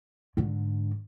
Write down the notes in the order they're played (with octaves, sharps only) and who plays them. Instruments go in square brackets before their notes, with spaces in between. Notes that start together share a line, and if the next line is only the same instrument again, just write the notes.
[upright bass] G#2 D3